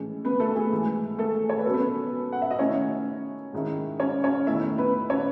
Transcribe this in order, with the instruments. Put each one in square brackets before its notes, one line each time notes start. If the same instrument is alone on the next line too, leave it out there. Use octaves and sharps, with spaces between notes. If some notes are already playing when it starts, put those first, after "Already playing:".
Already playing: [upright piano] A2 E3 G#3 C#4
B3 B4
A3 A4
G#4
G#2 E3 A3
A3 A4
C#5
B4
B2 F#3 C#4 A4
B3 B4
F#5
E5
D#5
D#3 A3 C#4 E4 C#5
G#2 D#3 G#3 C#4 E4
C#4 C#5
C#4 C#5
E2 D#3 A3 E4 E5
B3 B4
C#4 C#5